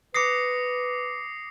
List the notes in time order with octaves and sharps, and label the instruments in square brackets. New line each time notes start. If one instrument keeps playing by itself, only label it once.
[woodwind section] B4 [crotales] D6 C7 [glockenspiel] D#6 A#6 C#7